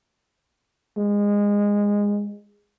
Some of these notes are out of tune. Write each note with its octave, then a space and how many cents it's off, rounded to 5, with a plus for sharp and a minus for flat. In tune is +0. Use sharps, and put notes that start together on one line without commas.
G#3 -20